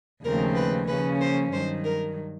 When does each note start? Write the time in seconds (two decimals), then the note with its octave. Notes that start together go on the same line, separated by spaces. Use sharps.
0.23 D#2 C#3 F3 A3 C4 A#4
0.56 B4
0.88 C#3 F3 A#3 C#4 B4
1.21 C5
1.52 G2 D#3 F#3 C5
1.85 A#4